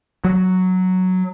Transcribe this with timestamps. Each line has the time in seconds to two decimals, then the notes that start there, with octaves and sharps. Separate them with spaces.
0.24 F#3